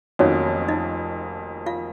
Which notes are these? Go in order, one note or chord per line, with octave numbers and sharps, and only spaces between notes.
F1 F2 D#3 F#3 A#3 C#4 C#5
D#4 D#5
F4 F5